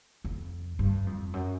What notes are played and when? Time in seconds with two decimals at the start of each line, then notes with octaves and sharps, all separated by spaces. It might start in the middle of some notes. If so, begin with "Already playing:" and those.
0.24 F2
0.79 G2
1.07 F2
1.33 F#2